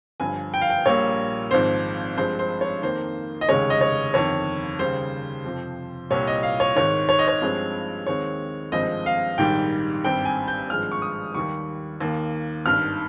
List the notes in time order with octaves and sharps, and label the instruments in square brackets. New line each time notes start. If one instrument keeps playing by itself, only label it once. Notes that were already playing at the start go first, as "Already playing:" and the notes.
[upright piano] G1 G2 F3 G#5
G5
F5
G5
A#1 A#2 G3 A#3 C#5
G#1 G#2 F3 C4 C5
G2 F3 G#3 C4 C5
C5
C#5
F2 D#3 A#3 C5
D#5
F1 D#2 C#3 G#3 C#5
D#5
C#5
G1 F2 D#3 C#5
D#2 C#3 G3 C5
F2 C3 F3
C2 A#2 G3 C#5
D#5
F5
C#5
G#1 G#2 D#3 C#5
C#5
D#5
C#5
G2 F3 G#3 C4
D#2 D#3 G#3 C4 C#5
G#1 G2 F3 G#3 C4 D#5
F5
A#1 G#2 D#3 G3 G5
G#1 G2 G3 C4 G5
G#5
G6
G#1 G2 F3 G#3 F6
C#6
D#6
D#2 D#3 G3 C#6
D#2 D#3 A#3
G#1 G2 D#3 F6